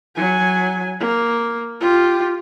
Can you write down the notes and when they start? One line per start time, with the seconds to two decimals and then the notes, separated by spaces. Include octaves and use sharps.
0.17 F#3 G#5
1.00 A#3
1.81 F4 G4